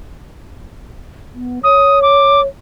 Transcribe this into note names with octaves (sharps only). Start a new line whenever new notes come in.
B3
C#5 D#6
D6